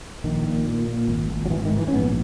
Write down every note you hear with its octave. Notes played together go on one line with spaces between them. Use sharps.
A#1 D#3
A#2
A#2
A#2
G#1
G#1
F#3
G#2 E3
D#3
G#2
E3
C#4
A#1 B3